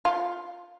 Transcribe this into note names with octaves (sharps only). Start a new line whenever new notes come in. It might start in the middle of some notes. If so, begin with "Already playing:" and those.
F4